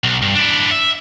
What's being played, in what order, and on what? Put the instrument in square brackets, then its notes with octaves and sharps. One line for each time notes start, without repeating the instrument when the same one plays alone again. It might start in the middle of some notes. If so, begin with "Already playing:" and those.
[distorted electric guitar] B1
G2
D4 E4
E5